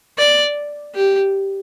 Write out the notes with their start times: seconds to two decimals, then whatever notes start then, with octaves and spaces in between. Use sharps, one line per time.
0.19 D5
0.95 G4